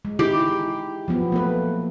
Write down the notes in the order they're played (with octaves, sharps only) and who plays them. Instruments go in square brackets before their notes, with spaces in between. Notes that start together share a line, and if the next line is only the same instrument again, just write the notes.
[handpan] G#3
[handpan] D#4 E4 G#4 [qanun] G4
[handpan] F3 F#3 B3
A3 A#3 B4